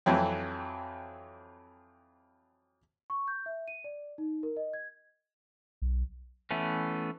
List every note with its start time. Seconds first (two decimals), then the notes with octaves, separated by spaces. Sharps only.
0.06 F2 E3 F#3 C4
3.10 C#6
3.28 G6
3.46 E5
3.68 D#7
3.84 D5
4.18 D#4
4.43 A#4
4.57 D#5
4.73 G#6
5.82 B1
6.51 E3 A3 B3 C#4